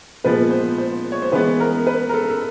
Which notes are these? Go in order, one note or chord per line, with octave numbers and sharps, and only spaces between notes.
A#2 F3 G#3 B3 B4
C5
C5
C#5
C5
E3 G#3 B3 B4
A#4
B4
A#4
A4
A4